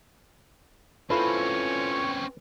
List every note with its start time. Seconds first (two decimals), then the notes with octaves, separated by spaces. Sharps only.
1.10 C4 C#4 E4 F4 A4 B4 C#5